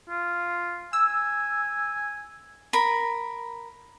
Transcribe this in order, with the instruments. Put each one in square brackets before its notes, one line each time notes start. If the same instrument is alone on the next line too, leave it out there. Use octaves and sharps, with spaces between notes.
[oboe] F4
[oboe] G#5 [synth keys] E6
[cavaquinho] A#4 B5